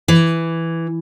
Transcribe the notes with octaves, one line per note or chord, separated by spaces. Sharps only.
E3